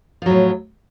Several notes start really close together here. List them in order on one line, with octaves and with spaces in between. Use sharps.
F3 F#3 A2